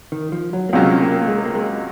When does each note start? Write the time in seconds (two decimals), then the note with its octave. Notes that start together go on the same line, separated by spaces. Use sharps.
0.12 D#3
0.32 F3
0.53 F#3
0.69 A#3
0.73 C#2 C3 F#3 G#3 C#4 F4
0.92 C4
1.01 A#3
1.21 A#3
1.28 G#3
1.45 A#3
1.55 G#3